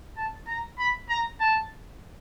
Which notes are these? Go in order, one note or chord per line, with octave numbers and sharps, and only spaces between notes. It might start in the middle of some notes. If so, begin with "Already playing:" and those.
A5
A#5
B5
A#5
A5